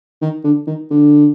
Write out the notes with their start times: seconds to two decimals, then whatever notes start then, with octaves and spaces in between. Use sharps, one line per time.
0.22 D#3
0.44 D3
0.67 D#3
0.90 D3